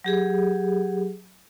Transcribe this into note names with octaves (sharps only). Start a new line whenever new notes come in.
F#3 G4 G#4